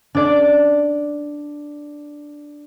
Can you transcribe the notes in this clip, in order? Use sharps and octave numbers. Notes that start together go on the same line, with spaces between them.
D4 D5